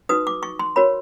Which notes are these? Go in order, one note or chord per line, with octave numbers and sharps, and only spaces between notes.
D#4 F#4 B4 D#6
D6
C#6
C6
F#4 A#4 C#5 B5